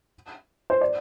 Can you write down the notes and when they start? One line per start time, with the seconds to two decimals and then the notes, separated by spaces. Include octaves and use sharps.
0.70 C5
0.81 D5